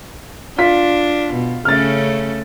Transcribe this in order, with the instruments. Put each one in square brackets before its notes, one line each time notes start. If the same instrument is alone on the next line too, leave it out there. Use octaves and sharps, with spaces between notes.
[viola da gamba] D4 [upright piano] F4 B6
[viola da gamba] B2
[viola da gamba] C#3 A3 C#4 [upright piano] F6 A6